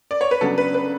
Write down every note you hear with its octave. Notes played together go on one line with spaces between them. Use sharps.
D5
C#5
B4
C#3 F#3 B3 D4 A4
B4
B4